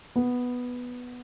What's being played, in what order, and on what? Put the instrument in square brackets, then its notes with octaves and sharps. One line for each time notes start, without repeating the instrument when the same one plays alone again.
[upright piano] B3